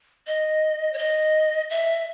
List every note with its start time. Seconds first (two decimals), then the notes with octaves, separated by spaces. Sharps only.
0.27 D#5
0.93 C#5
0.98 D#5
1.70 E5